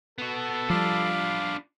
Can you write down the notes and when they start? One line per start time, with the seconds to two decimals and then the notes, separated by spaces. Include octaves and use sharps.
0.18 B3 F#4 A4
0.70 F3 G3 D4 F4 F5 B5 D6